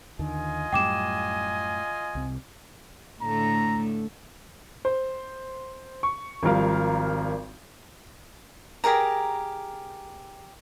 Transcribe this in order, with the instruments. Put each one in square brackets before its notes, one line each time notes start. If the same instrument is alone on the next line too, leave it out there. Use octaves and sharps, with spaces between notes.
[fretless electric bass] D#2 D3 D#3 [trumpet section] F4 D#5 G#5
[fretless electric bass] F#2 A2 G3 [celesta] G5 D6 E7
[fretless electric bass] C2 C3
[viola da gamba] A2 D3 A3 [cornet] A#5
[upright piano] C5
C#6
G#1 F3 G3 A#4 F5
[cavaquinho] G4 G#4 A#4 A#5